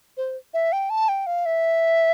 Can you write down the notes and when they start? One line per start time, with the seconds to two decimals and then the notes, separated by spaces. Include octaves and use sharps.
0.17 C5
0.54 E5
0.72 G5
0.90 A5
1.09 G5
1.26 F5
1.46 E5